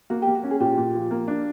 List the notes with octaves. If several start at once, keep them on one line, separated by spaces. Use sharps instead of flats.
A#3 F#4
G4
A#3
F#4
C#4
G#4
A#2 G4
A#2
F3
A#3
D4